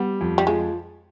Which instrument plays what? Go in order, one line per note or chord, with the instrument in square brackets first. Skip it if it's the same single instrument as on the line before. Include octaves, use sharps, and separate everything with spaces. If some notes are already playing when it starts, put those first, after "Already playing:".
Already playing: [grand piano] G3 [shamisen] B3
[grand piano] F2
[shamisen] G3
[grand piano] F3 [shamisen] G#3